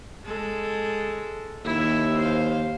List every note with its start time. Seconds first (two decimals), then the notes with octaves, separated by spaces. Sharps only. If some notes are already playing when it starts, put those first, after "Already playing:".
0.24 G#3 A4
1.64 D#2 E4
2.17 C5 F5